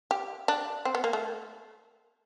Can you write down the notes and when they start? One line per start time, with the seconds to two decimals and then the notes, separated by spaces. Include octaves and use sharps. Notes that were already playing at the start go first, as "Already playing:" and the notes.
0.11 G4
0.48 D4
0.85 C4
0.95 B3
1.04 A#3
1.13 A3